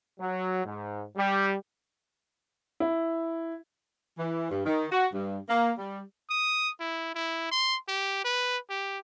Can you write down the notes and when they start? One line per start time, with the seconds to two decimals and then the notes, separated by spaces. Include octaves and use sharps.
0.20 F#3
0.65 G#2
1.16 G3
2.80 E4
4.19 E3
4.51 G2
4.66 D#3
4.92 F#4
5.14 G2
5.49 A#3
5.79 G3
6.30 D#6
6.80 E4
7.15 E4
7.52 C6
7.88 G4
8.25 B4
8.70 G4